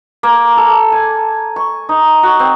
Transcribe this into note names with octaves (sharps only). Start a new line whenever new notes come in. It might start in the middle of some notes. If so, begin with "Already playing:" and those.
A#3
A4
G#5
C#6
D#4
F#4
C4